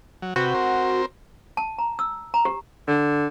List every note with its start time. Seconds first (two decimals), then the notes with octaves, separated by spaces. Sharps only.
0.22 F#3
0.36 C3 F#4 B4 G5
0.54 C4 A#4 C5
1.57 A5
1.79 A#5
1.99 E6
2.34 A#5
2.45 G4
2.88 D3